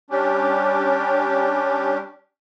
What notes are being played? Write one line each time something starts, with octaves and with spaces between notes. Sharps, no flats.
G3 C#4 D4 G4